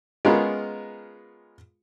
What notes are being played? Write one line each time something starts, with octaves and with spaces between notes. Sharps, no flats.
G#3 B3 C#4 F4 A#4